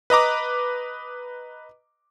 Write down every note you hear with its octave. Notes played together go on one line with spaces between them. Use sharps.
B4 D#5 A#5 D6